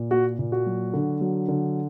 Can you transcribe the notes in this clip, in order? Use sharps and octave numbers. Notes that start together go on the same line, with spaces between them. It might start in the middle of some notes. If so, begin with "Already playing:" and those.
Already playing: A#2
A#3 F#4
A#2
F#4
F#3
D3
F#3
D3